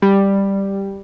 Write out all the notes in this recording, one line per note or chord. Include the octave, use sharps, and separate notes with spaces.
G3